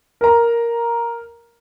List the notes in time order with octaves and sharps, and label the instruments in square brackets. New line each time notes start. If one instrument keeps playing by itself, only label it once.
[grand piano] A#4 A#5